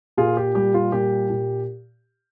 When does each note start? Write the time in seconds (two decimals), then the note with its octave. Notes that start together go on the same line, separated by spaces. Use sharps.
0.17 A#2 F4 G#4
0.37 G4
0.55 G3 G4
0.74 F4
0.92 A#2 G4
1.30 A#2